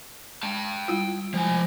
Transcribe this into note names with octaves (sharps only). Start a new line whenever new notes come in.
G#3 G5 A5
G3 E4 F4
F3 G#3 G#5